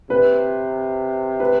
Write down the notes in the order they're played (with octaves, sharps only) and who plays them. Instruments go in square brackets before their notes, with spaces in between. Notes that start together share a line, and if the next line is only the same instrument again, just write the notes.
[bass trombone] C3 [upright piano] B4
[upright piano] B4